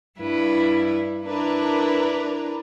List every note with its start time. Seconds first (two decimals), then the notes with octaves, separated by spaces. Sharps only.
0.20 G2 E4 B4
1.26 D4 E4 A#4 B4